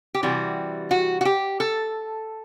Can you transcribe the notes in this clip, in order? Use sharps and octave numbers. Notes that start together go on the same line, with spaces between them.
G4
C3 E3 G3 F#4
F#4
F#4
G4
A4